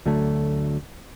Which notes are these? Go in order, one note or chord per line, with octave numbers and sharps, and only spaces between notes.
D2 D3 F#3 A3